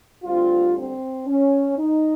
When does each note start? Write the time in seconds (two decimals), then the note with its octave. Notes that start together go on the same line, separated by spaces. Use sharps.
0.23 D2 D3 G3 C4 F4
0.75 C4
1.27 C#4
1.78 D#4